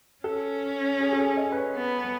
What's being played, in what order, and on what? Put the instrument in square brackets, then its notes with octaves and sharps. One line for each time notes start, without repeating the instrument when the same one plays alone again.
[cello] C#4 [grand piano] A4
[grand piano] G#4
A4
G#4
D#5
B4
C#5
[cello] B3